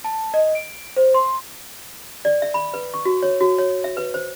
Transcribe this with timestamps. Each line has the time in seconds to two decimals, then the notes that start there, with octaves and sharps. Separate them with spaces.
0.04 A5
0.34 D#5
0.55 D7
0.97 C5
1.14 C6
2.25 D5
2.42 E5
2.54 B5
2.74 B4
2.94 C#6
3.05 F#4
3.23 C#5
3.41 F#4
3.58 C#5
3.84 E5
3.97 B4
4.14 C5